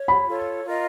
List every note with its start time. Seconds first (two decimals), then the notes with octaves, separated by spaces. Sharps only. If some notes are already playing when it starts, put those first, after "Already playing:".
Already playing: C#5
0.08 B5
0.27 F4 A4 C#5
0.64 F4 A#4 D#5